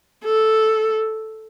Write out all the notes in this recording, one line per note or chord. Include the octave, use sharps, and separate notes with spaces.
A4